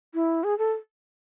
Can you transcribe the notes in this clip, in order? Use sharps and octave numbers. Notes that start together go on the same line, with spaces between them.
E4
G#4
A4